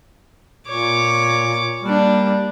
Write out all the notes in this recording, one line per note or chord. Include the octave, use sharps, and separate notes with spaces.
A#2 C#5 D6
G3 A#3 D4